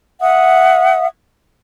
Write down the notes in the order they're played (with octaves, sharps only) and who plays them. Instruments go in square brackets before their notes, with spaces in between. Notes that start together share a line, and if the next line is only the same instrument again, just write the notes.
[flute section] E5 F#5 D#6